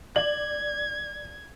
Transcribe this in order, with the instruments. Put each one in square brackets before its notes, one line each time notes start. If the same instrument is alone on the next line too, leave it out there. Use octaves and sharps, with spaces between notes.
[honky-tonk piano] D5 F#7 [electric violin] G#6